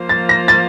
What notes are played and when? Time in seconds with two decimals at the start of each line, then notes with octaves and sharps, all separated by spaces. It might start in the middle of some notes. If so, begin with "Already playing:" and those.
Already playing: F3 A#3 F4 C5
0.09 A6
0.29 A#6
0.48 A6